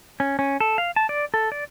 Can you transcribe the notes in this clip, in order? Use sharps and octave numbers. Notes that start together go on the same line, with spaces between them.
C#4
C#4
A4
F5
A5
D5
A4
D5